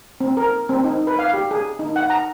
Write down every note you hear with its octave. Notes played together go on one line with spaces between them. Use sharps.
C4
A#4
C4
D#4
B4
F5
G4
G#4
D#4
F#5
A#5